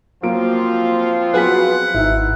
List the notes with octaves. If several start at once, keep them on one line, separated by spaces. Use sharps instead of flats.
F3 F#3 A#3 C4 F4 D7
F#3 B3 F#4 G#4 B4 F#5 B6
G#1 D#4 E4